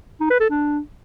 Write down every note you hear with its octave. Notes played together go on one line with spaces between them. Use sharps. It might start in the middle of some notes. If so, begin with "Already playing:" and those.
D#4
B4
A4
D4